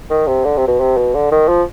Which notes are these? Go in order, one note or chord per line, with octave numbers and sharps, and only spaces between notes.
D#3
C3
D3
C3
B2
C3
B2
D3
D#3
F3